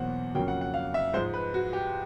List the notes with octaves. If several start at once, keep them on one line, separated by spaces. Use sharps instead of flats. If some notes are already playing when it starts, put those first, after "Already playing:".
Already playing: E2 B2 F#3 A#3 C5 F#5
F2 C#3 F#3 A#3 G5
F#5
F#5
F5
E5
G#2 F3 G#3 C5
B4
F#4
G4